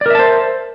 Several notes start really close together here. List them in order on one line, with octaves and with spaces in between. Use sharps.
D5 A#4 E5 A5 C5